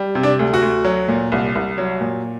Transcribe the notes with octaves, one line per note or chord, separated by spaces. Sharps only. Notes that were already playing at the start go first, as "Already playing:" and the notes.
Already playing: G3
C3
D4
D2
F#4
D2
F#3
A#2
C2
C2
F#3
A#2